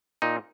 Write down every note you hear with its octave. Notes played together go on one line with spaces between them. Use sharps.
A#2 D#4